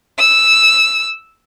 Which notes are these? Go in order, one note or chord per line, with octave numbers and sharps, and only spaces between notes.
E6